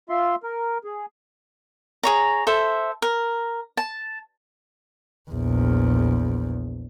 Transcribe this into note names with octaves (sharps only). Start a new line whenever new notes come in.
F4 E5 C6
A#4
G#4
G#4 C#5 A#5
A4 C5 E5
A#4
A5
A#1 E2